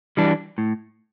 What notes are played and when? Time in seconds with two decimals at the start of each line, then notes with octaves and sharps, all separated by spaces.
0.17 E3 G3 D4
0.58 A2